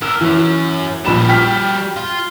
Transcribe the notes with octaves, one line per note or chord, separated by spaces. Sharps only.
B3 A#4 E6
F#2 E3 C#4
A#1 G3 F#4 B5 E7
G5 F6 B6
F4